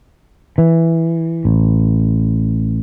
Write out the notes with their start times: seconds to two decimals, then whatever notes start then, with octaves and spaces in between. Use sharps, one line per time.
0.58 E3
1.45 A1